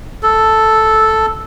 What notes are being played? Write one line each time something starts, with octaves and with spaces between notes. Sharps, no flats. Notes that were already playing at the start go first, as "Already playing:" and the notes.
A4